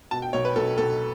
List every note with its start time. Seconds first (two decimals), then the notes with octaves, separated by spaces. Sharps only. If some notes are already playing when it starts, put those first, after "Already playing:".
0.11 B2 A5
0.22 G5
0.33 B1 C#5
0.45 B4
0.56 B1 A4
0.78 B1 A4